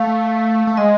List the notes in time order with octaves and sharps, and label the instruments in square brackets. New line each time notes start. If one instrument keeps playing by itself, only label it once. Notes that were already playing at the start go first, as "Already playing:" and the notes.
Already playing: [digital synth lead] A3 [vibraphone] F5
[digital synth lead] A3
[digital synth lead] G#3 [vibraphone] D#5